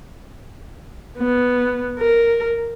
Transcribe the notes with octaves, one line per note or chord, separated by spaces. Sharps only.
B3
A#4